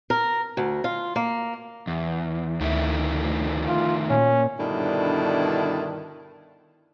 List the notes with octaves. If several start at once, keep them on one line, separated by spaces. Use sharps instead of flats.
A#4
D2
F4
A#3
E2
D2 D#3 A3 E4
F4
A#2 C#4
G2 B2 D3 D#3 D4 E4